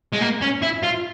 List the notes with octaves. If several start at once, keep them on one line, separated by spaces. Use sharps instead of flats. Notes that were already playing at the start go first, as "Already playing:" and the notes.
G#3
A#3
C#4
E4
F4